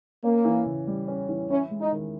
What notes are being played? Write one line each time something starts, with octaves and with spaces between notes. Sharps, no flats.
A#3 C#4
E3
C#3
G3
C#4
E3
C#4 E4
G#3
D#4
D#3